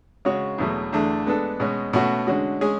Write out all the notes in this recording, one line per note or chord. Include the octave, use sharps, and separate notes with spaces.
C#3 G#3 C#4 F#4 C#5
E2 B2 F#3 A3
E2 D3 A3 D4
G#3 B3 D4 A4
B2 G#3 C#4
B2 A3 C#4 F#4
D3 G#3 C#4 F#4
G#3 C#4 G#4